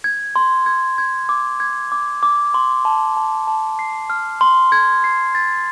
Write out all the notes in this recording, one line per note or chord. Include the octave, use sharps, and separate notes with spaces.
G#6
C6
G#6
G#6
D6
G#6
D6
D6
C6
A5
A5
A5
C7
F6
C6
G#6
C7
A6